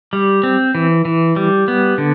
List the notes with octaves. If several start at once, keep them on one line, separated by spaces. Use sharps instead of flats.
G3
C4
E3
E3
G3
B3
D3